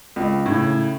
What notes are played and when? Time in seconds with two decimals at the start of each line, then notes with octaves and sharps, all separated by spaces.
0.16 C#2
0.46 A2 C#3